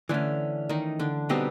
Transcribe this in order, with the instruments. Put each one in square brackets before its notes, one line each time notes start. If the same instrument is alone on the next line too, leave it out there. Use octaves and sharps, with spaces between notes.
[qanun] D3 D4 [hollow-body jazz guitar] E3 A3 C#4
[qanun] D#3 D#4
D3 D4
[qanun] B2 B3 [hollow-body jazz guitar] G3 C4 D#4 G4